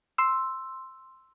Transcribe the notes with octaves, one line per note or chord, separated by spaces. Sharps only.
C6 E6